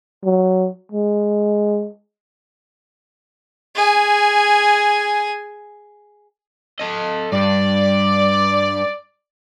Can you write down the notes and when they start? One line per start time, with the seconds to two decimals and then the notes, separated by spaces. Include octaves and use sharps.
0.24 F#3
0.92 G#3
3.75 G#4 G#5
6.79 A4 D#5
7.32 G2 D5